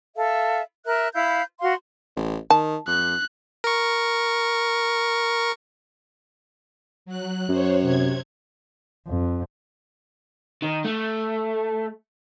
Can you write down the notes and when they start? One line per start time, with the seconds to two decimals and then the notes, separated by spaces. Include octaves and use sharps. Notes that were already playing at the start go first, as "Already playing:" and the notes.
0.16 A4 E5 F5
0.86 A#4 E5 F#6
1.15 E4 F5 B5 G6
1.61 F#4 F5 C6
2.16 A1
2.50 D#3 A5
2.87 F2 F#6
3.64 A#4 C#6
7.06 F#3 F#6
7.49 F#2 C5 C#5
7.81 C3 G#6
9.07 F2
10.62 D#3
10.85 A3